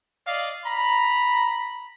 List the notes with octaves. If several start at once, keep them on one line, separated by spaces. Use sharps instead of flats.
D5 D#5 F5
A#5 B5